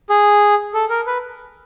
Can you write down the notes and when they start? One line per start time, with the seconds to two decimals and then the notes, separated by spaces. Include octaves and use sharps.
0.10 G#4
0.74 A4
0.90 A#4
1.06 B4